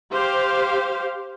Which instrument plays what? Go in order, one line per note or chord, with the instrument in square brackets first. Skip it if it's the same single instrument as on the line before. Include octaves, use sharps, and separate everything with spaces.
[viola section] G4 C5 F5